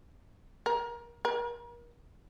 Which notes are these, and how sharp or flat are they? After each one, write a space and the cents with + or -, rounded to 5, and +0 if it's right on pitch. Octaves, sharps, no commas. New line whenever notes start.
A#4 +25
A#4 +35